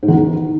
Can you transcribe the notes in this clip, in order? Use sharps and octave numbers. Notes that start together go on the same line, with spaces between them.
G#2
E2
D#3